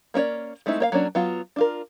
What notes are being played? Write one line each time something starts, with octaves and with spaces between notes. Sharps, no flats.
A#3 C#4 E4 C#5 D5
G#3 A3 C4 D#4 E4
A#3 C#5 F5
F#3 A#3 C#4 D4
F#3 B3 F4
D4 F4 A#4